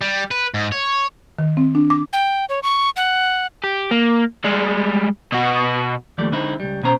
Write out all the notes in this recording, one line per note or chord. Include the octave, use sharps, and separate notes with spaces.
G3
B4
G#2
C#5
D#3
C4
D4
D6
G5
C#5
C#6
F#5
G4
A#3
G3 G#3
B2 F#4
D#2 F3 G3 A3 D5
D3 G#3 C4 D#4 E4
C#2 G3
B2 B3 C#4 C5 A#5